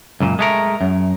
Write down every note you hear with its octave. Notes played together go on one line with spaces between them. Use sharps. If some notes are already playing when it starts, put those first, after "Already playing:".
C#2 F#2 A#2
G#3 A3 A#4
F#2